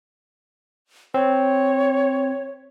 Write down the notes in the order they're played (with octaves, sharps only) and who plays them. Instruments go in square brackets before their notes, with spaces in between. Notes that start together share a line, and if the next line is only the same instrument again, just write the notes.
[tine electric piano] C4 [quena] C#5